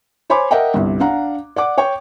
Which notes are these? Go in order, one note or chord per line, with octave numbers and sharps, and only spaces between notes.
C5 C#5 G#5 B5 C6 D6
A#4 D#5 E5 F#5 G5
G1 C2
D4 F5 F#5 A#5
D5 F#5 D6
C#5 G5 C#6